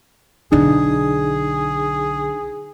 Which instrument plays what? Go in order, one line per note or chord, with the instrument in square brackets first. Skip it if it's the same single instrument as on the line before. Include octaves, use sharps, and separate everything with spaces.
[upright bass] B1 D3 [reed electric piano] D4 D#4 [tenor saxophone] G#4